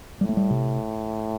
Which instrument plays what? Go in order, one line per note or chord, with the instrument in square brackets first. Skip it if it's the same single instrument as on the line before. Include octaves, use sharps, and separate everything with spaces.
[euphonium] A2 [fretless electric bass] G3
[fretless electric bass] A3
G3
C3